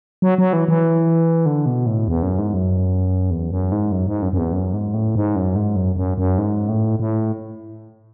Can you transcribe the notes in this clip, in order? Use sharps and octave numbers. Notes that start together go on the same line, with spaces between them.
F#3
F#3
E3
E3
D3
B2
A2
E2
F#2
G#2
F#2
E2
F#2
G#2
F#2
G#2
F#2
F#2
E2
F#2
G#2
A2
G#2
F#2
G#2
F#2
F#2
F#2
G#2
A2
A2